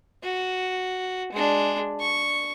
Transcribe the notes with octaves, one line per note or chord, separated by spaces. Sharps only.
F#4
G#3 D4
C#6